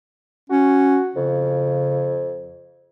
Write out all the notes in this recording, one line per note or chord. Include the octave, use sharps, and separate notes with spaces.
C#4 F#4
F2 C#3